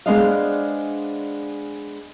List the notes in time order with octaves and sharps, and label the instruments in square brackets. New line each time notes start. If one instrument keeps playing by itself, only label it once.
[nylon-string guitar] G#3 B3 D4 C5 D#5 F5